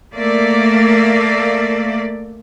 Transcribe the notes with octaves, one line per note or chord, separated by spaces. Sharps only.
A3 A#3 D5 E5